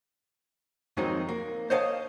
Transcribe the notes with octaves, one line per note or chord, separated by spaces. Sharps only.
F2 D#3 F#3 G#3 C4 D#4
A#3
C5 C#5 D#5 F5 A5